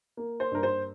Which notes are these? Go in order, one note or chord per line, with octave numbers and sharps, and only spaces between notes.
A#3
C5
G2 A#4
C5